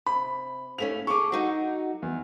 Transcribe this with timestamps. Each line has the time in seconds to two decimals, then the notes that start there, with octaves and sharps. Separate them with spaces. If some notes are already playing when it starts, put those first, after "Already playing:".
0.06 C3 B5
0.78 D#2 A3 C#4 F7
1.07 G#4 A4 C#6 D6
1.32 F#3 D#4 F#4
2.02 E2